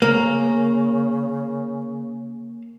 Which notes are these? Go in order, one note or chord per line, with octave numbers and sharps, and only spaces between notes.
C#3 A#3